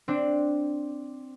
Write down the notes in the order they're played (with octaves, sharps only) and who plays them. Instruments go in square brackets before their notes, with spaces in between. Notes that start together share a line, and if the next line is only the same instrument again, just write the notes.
[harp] C4 D4